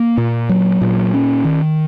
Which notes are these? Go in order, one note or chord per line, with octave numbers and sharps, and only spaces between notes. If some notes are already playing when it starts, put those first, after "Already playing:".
Already playing: A#3
A#2
F#3
A#2
C#4
D#3